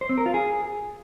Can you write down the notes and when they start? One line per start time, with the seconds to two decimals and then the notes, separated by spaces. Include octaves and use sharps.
0.01 C5
0.09 C4
0.18 A#4
0.26 F4
0.34 G#4